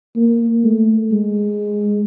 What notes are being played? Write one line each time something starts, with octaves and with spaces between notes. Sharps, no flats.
A#3
A3
G#3